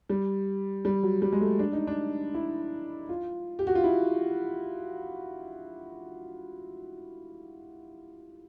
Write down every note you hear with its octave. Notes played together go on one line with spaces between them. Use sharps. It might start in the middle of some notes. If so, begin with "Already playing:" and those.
G3
G3
F#3
G3
G#3
A3
D4
D#4
D4
E4
F4
G4
F#4
F4
E4